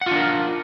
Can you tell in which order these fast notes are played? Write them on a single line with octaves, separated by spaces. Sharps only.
F#5 F4 D4 A#4